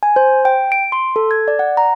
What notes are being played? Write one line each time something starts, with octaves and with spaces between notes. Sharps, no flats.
G#5
C5
G5
D7
C6
A4
G#6
D5
F#5
A#5